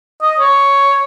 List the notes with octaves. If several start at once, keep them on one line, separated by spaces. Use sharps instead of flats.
D#5
C#5